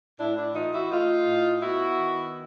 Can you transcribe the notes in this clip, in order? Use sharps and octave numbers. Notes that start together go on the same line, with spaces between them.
A2 D4 E4
D4 E4
E3 D#4 F4
E4 F#4
A3 D#4 F4
A2
B3 E4 F#4
D#3